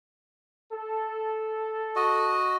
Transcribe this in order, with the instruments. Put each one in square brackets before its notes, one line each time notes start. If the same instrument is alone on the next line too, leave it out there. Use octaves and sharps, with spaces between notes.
[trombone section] A4
[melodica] F#4 D#5